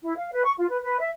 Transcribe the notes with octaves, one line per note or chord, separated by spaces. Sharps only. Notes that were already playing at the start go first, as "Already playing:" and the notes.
E4
F5
B4
C#6
F4
B4
B4
E5